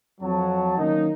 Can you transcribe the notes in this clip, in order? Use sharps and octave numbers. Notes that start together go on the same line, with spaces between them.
F2 F#3 A5
D#3 F#3 A#3 C#4 D#4